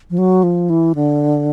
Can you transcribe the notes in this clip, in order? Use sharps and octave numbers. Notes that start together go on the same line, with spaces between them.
F3
F#3
F3
E3
D3